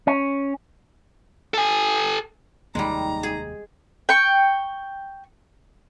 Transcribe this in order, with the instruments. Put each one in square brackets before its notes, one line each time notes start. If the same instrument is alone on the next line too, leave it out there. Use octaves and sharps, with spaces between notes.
[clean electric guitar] C#4
[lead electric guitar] A4 G#5
[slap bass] F1 D#2 A#3 [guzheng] G3 G#3 [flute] D#4 [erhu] A#5
[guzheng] G#4
[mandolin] G5 C#6